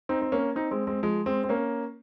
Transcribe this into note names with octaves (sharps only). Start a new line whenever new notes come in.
C4 D#4
C4
A#3 C#4
C4 D#4
G#3 C4
G#3 C4
F3 G#3
G#3 C4
C4
A#3 C#4